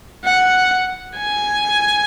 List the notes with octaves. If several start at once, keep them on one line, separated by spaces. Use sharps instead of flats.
F#5
G#5